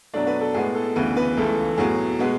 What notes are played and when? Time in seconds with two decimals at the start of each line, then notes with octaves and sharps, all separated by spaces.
0.14 B2 F#3 A3 D4 D5
0.27 B3 B4
0.41 A4
0.54 A2 G#3 B3 G#4
0.75 A4
0.96 D2 C#3 E3 B3 B4
1.16 B3 B4
1.37 C#2 C#3 E3 A3 A4
1.78 A2 F#3 B3 G#4
2.19 B2 G#3 B3